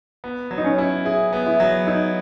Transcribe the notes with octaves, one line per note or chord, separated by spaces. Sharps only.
B3
F#3
D#4
C#4
E4
E4 G#4
B3
E4
F#3
D#4 E4